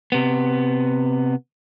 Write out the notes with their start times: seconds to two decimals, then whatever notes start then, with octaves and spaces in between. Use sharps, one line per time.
0.12 C3 B3